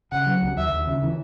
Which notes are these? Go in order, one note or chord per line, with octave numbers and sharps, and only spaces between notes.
C#3 F#5
F#3
C#2
D#2 E5
D#2
C#3
E3